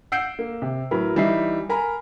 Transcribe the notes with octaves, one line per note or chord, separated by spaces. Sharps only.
F#5 E6 G6 C7 D7
A#3
C3
A2 F#3 A#4 B4 B5
E3 G3 D#4 E5 C7
A#4 G#5 A#5 B5